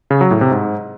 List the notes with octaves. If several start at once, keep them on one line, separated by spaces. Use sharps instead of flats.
C#3
F#3
A2
C3
G#2